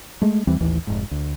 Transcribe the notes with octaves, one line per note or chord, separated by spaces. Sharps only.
G#3 A3
D#2 E3 G3 C4
A1 D#2 E3
F1 G#2
D2